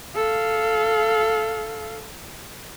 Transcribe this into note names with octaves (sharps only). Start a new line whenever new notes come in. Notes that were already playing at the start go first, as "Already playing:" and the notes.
A4 F5